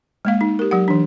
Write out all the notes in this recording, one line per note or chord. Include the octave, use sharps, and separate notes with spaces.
G#3 A#3 F5
D#4
G4 A#4
F#3 G4 F#5
E3 D4